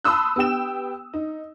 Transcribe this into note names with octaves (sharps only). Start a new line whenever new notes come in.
A5 B5 C6 D#6 E6 F#6
B3 G4 G5 E7
D#4